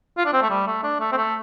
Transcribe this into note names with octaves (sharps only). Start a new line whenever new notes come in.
F4
D4
C4
A3
G3
A3
D4
A3
C4
A3